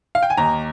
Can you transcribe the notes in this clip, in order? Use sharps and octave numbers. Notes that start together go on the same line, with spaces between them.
F5
G5
G#5
D#2 A#5